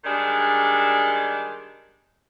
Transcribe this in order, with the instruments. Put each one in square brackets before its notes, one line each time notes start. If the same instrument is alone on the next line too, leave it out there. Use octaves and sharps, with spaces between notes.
[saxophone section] D#3 G3 G#3 D4